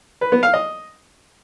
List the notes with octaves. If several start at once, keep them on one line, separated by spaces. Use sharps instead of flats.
B4
B3
F5
D#5